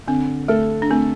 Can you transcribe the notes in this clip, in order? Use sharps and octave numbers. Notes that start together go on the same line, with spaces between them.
D3 C4
A3 A4
D4
A3 C4